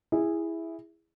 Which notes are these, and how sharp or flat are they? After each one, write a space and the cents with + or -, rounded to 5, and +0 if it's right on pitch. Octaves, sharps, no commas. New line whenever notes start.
E4 +0 G#4 -15